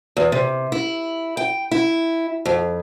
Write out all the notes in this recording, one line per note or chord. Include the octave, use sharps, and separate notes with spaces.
E2
C3
E4
G5
E4
F2